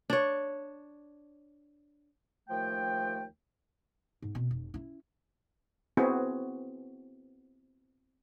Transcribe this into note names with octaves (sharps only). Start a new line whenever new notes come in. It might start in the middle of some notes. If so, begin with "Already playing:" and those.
D4 C#5
D#2 F3 A3 G5
G#2
B2 C4
F1
C#4 E4
B3 C4 E4 F#4 G#4